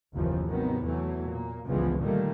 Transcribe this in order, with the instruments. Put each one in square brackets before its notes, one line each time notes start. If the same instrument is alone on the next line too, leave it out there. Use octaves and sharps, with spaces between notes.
[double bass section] F#1 D#2 B2 E3 F3
G#1 C3 D#3 F#3 B3
E2 E3 F#3 A3
A#2 A#3
G1 C#2 E3 F3 G#3 B3
A#2 D3 D#3 G3 A3 A#3